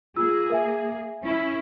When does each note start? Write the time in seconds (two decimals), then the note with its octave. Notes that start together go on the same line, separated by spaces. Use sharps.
0.16 A#3 F4 G#4 E6
0.50 A#4 E5 G#5
1.24 C#4 E4